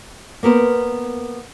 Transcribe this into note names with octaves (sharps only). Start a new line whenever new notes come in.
A#3 B3 A#4 C5